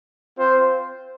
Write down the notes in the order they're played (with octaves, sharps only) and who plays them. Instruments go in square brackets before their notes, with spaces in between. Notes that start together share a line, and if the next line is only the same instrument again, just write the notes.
[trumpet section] C4 F4 C5